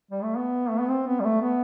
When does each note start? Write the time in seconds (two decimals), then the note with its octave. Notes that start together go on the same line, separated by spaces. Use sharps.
0.11 G3
0.23 A3
0.37 B3
0.69 A3
0.80 B3
0.89 C4
1.07 B3
1.20 G3
1.24 A3
1.41 B3